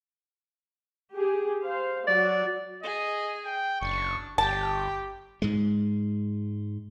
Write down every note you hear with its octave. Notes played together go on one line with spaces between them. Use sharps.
G4 G#4
C5 F5
F#3 F#4 D5
G#4 D#5
G5
F#1 D4 C#6
G1 G4 G5 A5
G#2 G#3